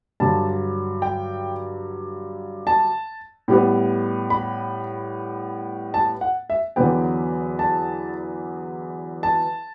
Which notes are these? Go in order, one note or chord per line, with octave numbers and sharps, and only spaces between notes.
G2 D3 F#3 A5
G5
A5
A2 G3 B3
B5
A5
F#5
E5
E2 D3 F#3 B3 G5
A5
A5